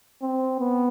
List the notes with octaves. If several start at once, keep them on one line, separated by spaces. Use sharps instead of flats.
C4
B3